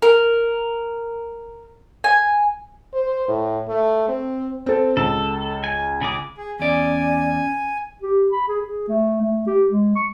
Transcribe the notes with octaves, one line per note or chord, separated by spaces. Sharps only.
A#4
G#5
C5
A2
A3
C4
C4 A4
C#2 A4
G#5
C#3 G#4 D6
G#4
E2 C#4 D5 G#5
G4
B5
G#4
G#4
A3
A3
G4
G#3
C#6